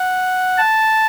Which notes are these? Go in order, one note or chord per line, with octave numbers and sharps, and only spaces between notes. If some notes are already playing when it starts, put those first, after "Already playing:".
Already playing: F#5
A5